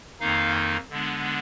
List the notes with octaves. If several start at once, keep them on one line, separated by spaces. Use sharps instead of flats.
F2 D#3 A#3 D#4 F5
D3 G#3 B3 D4